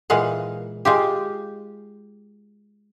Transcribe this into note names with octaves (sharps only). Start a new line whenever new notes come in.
A#2 E3 G#3 F5 F#5
G#3 F4 G4